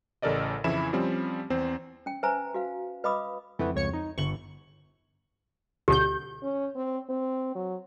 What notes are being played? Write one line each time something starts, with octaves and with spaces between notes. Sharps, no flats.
A1 C#3 A4 A#4 D5 D#5
F2 C#3 E3 E4 B5 E7
F3 G3 C4 C#4
E2 C4 C5
C#4 G5
B4 C5 E5 G#5 A#5
F#4 B4 F5
B4 D#5 F5 B5 D6 D#6
F2 E3 A3 B3
C#2 C#5 C#7
D#4
G1 C#6 F#7
D2 B2 G4 G6
C#4
C4
C4
F#3